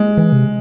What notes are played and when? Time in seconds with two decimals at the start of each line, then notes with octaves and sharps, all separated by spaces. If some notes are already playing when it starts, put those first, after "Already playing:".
Already playing: G#3
0.18 E3
0.32 C3